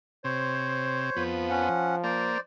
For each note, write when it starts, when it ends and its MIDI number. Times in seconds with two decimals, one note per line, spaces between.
0.24 1.10 48
0.24 1.23 72
0.24 1.23 73
1.16 1.69 41
1.16 2.38 53
1.16 1.69 59
1.50 1.96 61
1.50 1.96 78
2.03 2.38 58
2.03 2.40 72
2.03 2.40 74